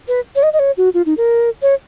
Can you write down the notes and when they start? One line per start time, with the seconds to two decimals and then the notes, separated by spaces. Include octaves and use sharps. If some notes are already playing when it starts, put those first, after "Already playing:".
0.08 B4
0.35 C#5
0.43 D#5
0.53 D#5
0.59 C#5
0.77 F#4
0.94 F4
1.06 D#4
1.17 A#4
1.62 C#5